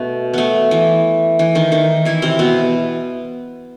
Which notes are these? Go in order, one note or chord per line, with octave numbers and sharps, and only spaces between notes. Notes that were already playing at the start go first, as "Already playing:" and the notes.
Already playing: B2 A3 B3
A3 B3
E3
E3
D#3 D#4
D#3 D#4
E3 E4
C3 C4
B2 B3